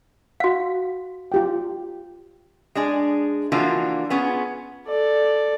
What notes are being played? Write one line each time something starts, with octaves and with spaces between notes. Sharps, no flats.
F#4 F5 F#5
F4 G4 G5
G#3 D4 G#4
E3 F3 A#3 D4 F4 F#4
B3 C#4 F4 G#4
A4 D5